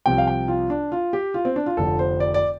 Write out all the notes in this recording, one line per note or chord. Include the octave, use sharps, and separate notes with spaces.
C2 C3 F3 G5
F5
G5
F4
D4
F4
G4
F4
C4
D4
F4
F1 F2 D3 F3 A4
C5
D5
D5